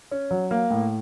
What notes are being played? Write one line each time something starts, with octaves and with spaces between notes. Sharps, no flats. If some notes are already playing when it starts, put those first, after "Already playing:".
C#4
F#3
A#3
A2